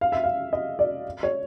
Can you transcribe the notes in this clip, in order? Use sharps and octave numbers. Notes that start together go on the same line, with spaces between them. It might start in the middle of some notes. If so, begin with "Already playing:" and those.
F5
E5
F5
D#5
D5
C#5